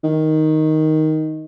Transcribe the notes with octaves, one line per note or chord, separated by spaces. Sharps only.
D#3